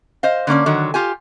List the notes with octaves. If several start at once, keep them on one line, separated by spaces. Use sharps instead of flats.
C5 D#5 F5
D3 A#3 C#4 D5
D3 D#3 F#3
F4 G4 G#5